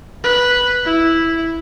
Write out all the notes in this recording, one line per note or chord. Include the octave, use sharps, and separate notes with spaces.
B4
E4